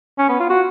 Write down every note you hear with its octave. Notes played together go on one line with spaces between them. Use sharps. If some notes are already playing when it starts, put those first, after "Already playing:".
C#4
B3
F4
F#4